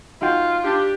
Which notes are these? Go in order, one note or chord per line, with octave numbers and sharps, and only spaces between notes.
D#4 F4 F#4 G5
D4 G4